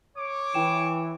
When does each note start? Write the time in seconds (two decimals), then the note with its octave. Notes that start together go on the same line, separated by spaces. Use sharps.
0.17 C#5 D6
0.54 E3 E4 G5 E7